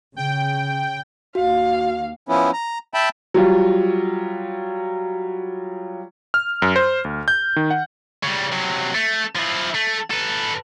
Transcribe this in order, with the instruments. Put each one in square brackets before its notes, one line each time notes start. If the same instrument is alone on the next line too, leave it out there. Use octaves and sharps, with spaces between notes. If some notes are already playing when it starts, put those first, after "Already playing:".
[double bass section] C#3 [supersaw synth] G5
[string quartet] D#2 F5 [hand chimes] F#4
[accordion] F3 B3 C#4 E4
A#5
E5 G5 A5 B5
[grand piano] F#3 G3 F4
[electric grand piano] F6
F#2
C5
D2
G6
D#3
F#5
[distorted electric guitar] C#3 G3
C3 F#3
A3
F3 E4
A3
A4 B4